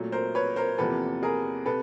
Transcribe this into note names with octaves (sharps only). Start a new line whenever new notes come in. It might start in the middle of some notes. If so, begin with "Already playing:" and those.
Already playing: A#2 F#3 A3
A#4 C5
B4 C#5
A#4 C5
E2 C3 F3 A#3 A4 B4
G#4 A#4
C3 A4 B4